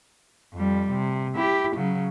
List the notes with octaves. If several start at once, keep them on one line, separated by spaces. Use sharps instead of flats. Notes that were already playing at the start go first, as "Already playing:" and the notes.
F2 G3
C3
E4 G4
C#3 F#3